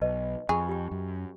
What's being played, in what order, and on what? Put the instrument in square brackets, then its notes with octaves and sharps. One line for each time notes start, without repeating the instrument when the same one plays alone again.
[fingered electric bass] B1 [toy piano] B4 D#5 A5
[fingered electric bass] F2 [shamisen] G#4 [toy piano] B5 C#6
[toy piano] G4 G5
[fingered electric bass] F#2